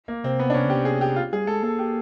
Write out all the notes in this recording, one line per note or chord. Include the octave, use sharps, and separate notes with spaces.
A#3
C3 C4
B3
D4
C3 C#4
C#3
G4
C3
G#4
G4
F4
G3 G#4
G#3 A4
A#3 A4
G4